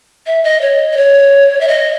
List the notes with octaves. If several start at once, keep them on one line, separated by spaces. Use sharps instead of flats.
E5
D#5
C#5
D#5
C#5
E5
D#5